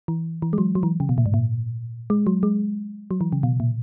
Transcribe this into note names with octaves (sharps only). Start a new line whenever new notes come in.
E3
E3
G#3
F#3
F#3
E3
C#3
B2
A#2
G#2
A#2
G#3
F#3
G#3
F#3
E3
C#3
B2
A#2